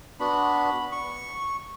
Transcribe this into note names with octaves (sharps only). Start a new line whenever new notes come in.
B3 D4 F#4 B5
C#6